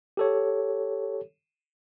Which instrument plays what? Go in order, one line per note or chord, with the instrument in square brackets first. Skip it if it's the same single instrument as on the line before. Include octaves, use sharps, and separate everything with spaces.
[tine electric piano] G4 A4 C#5